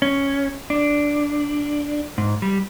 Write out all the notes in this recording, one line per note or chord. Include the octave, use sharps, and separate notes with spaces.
C#4
D4
G#2
G3